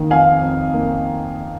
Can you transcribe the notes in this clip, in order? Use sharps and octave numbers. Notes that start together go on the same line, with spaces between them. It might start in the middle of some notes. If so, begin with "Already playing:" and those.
Already playing: D#3 A#3
F2 F5 G#5
F2
A#3